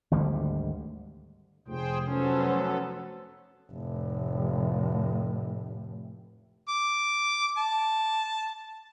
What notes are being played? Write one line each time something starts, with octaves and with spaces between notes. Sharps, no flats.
G#1 D2 D3 G3
F1 G#4 C5 G5
F#3 B3 C#4 A4 C5
F1 A2
D6
A5